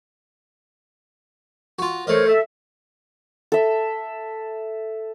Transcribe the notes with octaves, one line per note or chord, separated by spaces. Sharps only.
F4 F#4
A3 A#4 C5 C#5 D#5
A4 E5
A4 E5